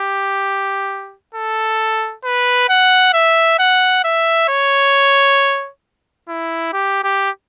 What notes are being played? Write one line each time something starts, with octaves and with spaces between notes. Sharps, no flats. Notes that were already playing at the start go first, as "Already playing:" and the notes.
Already playing: G4
A4
B4
F#5
E5
F#5
E5
C#5
E4
G4
G4